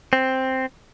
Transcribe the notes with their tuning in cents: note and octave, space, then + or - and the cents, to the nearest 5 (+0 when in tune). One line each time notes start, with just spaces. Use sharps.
C4 +0